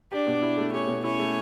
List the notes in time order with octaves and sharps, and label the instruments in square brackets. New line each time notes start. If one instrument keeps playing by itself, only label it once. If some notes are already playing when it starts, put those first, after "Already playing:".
[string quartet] D4 D5 [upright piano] G4
[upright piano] B2
E4
A3
[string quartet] C#4 C#5 [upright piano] G4
[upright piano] B2
[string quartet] C#4 C#5 [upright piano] E4
[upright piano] A3